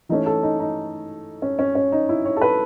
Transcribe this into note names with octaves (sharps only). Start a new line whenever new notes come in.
E3 A3 C#4 D#4
A4
D#4
D#4
C#4
C#4
C#4
D#4
E4
C#5
A4
B4